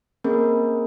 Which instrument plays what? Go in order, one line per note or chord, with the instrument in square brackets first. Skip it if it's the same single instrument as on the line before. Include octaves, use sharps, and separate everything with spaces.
[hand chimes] A#3 C4 C#4 G#4 A#4